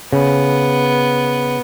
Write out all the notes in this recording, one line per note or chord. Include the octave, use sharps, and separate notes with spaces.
C#3 B3